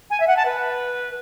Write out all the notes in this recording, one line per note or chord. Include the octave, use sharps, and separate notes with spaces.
G#5
E5
F#5
A5
B4